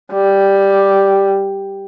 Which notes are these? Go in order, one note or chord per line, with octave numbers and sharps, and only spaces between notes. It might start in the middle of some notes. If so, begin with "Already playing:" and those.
G3